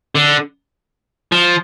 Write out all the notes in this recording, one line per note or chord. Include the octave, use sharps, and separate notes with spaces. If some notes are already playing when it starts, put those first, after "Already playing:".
D3
F3